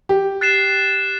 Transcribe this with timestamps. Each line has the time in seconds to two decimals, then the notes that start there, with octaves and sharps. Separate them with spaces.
0.09 G4
0.41 F#6 A6 C7 E7